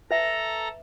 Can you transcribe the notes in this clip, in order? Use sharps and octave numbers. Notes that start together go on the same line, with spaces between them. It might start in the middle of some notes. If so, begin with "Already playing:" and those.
A4 B4 E5 A#5 A#6